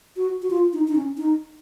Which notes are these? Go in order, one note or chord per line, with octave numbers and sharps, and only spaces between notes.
F#4
F#4
F4
D#4
D#4
C#4
D#4